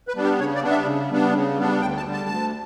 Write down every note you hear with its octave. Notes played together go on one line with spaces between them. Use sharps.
B4
G3 B3 D4
G4
C#3 C#5
D5
G3 B3 D4
E5
C#3
G3 B3 D4
C#3
G3 B3 D4
D2 G5
A5
D3 G3
A5
D2